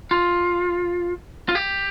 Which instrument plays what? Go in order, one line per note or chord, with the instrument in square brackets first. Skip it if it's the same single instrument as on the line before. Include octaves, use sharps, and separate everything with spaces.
[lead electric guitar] F4
F4
G4